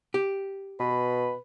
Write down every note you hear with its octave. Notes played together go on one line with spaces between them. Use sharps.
G4
B2 B4